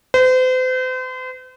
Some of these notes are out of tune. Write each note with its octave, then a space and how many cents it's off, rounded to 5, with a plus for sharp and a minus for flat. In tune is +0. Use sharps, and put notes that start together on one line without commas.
C5 -40